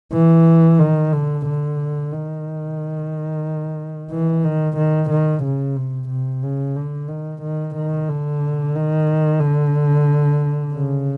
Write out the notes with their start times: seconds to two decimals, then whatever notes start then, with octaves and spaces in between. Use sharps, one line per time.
0.13 E3
0.79 D#3
1.13 D3
1.46 D3
2.12 D#3
4.11 E3
4.44 D#3
4.77 D#3
5.10 D#3
5.44 C#3
5.76 C3
6.09 C3
6.43 C#3
6.76 D3
7.09 D#3
7.42 D#3
7.75 D#3
8.09 D3
8.75 D#3
9.41 D3
10.74 C#3